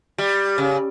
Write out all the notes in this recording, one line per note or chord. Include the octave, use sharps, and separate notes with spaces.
G3
C#3